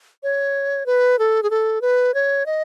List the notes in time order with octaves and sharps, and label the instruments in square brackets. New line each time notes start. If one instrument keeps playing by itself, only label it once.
[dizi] C#5
B4
A4
G#4
A4
B4
C#5
D#5